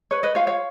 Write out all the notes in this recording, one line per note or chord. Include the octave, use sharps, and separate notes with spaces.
B4 C#5
B4 D#5
F4 C#5 F5
C#5 F5